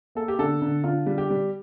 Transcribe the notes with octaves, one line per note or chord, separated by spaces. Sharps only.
A#3 A4
G4
D3 A4
D3
D3 F4
G3
G4
G3